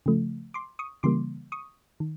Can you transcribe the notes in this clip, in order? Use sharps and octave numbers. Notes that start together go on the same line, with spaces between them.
C#3 F3 A3
C6 D6
C#6 D#6
C#3 E3 G3 A#3 C6 D6
C#6 D#6
D#3